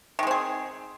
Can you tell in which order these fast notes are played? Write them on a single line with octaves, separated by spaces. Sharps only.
D#3 G#3 C4 G#4